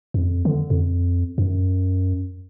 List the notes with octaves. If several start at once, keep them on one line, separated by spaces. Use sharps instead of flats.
F2
D3
F2
F#2